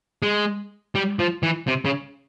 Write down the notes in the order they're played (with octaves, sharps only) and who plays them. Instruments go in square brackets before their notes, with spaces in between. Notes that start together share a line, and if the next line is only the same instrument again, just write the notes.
[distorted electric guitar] G#3
G3
F3
E3
C3
C#3